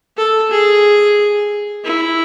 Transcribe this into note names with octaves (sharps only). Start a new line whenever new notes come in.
A4
G#4
E4